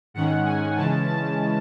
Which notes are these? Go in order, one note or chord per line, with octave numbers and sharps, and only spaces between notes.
G#2 D#3 G#3 C#4 F#5
G#5
C#3 E3 G#3 C#4 A5
A5